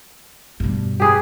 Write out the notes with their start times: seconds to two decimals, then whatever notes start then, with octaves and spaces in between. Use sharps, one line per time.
0.60 G2 B2
1.00 G4 G#4 B4